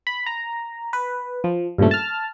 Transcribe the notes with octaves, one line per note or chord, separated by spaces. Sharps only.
B5
A#5
B4
F3
G2 A#2 C#3 A3
A5 F6